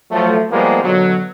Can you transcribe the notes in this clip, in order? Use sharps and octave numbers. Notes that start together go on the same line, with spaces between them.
F3 F#3 A3
F3 G3 G#3 A#3 B3
B2 D3 F#3